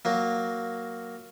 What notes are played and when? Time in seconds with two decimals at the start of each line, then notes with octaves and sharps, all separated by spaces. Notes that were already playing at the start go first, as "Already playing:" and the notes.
0.05 F#3 A#3